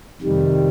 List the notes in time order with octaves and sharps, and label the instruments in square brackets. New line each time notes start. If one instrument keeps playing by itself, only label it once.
[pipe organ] F2 C3 D#3 G3